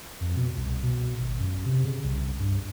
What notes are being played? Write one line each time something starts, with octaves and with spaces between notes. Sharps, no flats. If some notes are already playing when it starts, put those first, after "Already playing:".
F2
B2
C2
B2
G#1
F#2
C3
C#3
C2
G2